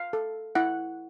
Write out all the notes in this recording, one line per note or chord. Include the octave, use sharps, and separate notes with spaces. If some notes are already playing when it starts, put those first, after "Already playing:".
Already playing: F5
A4
E4 F#5